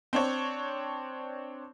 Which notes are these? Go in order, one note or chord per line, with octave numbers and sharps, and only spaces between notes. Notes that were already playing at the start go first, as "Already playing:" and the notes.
C4 D4 C#5